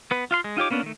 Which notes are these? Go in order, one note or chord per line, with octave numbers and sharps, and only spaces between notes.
B3 B4
F4 F5 C6
G#3
D#4 F4 G4 C#5 D6
A#3 B3 C#4 D4
D#3 A3